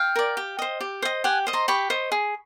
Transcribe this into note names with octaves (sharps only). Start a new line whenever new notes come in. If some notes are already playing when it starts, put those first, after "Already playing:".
Already playing: F5 G5
A#4 D5
G4
C5 D#5
G4
C5 D#5
G4 F#5 G#5
C5 D#5
A#5 C6
G4 B5 C#6
C5 D#5
G#4